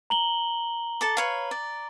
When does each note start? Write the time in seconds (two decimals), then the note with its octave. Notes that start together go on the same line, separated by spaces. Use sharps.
0.10 A#5 F#7 G7
1.01 A4 A5 D6
1.17 B4 C#5 F5
1.51 D5